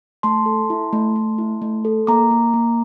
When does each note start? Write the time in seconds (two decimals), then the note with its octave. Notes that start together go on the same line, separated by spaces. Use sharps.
0.23 A3 A5 C6
0.46 A4
0.70 E4
0.93 A3
1.16 A3
1.38 E4
1.62 A3
1.85 A4
2.07 A#3 A#5 D6
2.31 A#3
2.54 A#3